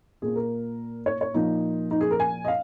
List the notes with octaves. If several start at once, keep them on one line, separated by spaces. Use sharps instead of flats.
A#2 A#3 G#4
A#4
C#5
C#5
A#2 F3 A#3 D#4
D#4
G#4
A#4
G#5
D#5
F5